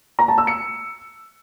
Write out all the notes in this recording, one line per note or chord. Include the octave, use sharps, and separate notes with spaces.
A#5
A5
E6
C#7